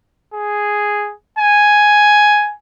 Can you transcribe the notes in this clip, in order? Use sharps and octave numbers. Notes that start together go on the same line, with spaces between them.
G#4
G#5